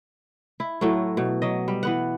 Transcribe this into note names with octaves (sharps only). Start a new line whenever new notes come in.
E4
A2 F#3 A3
B2
F#3 D#5
G3
E3 B3 F#5